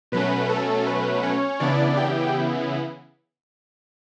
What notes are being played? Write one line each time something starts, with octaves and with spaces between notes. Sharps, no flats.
B2 F#3 A3 C#4 B4
A4
B4
C#4 C#5
C#3 E3 B3 D4 E4 D5
G4 G5